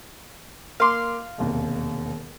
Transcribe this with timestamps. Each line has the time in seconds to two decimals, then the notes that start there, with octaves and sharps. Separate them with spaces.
0.80 A#3 F5 C6 D6
1.38 E1 D#2 C3